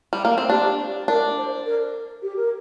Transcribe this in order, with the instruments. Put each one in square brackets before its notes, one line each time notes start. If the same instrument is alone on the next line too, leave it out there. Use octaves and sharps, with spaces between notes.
[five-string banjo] G3
A#3
C4
[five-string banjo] D4 [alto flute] G4
[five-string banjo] D4 [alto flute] A#4
[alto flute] C5
A#4
G4
A#4